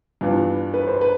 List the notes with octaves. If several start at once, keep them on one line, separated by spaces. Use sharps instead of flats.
G2 E3 B3 D4 F4
B4
C5
B4